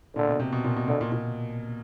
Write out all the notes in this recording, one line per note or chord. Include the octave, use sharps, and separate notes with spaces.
A#2 D3
B2
C3
B2
A#2
B2
B2 D3
A#2
A#2